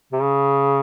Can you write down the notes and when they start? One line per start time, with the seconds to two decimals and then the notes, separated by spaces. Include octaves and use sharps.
0.13 C3
0.22 C#3